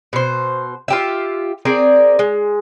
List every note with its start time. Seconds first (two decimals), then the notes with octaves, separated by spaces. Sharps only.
0.13 B2 C5
0.88 F4 G4 E5
1.65 C4 G#4 A#4 D5
2.19 G#3